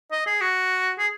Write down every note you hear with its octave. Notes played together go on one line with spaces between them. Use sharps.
D#5
G#4
F#4
G#4